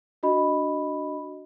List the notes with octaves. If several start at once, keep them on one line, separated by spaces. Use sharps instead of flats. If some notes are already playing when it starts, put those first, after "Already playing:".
D4 F#4 D#5 B5